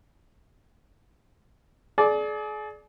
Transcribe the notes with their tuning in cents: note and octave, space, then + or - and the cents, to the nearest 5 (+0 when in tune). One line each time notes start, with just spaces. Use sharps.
G#4 +40 D5 +0